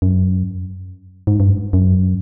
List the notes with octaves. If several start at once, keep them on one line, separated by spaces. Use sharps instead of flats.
F#2
G#2
G2
F#2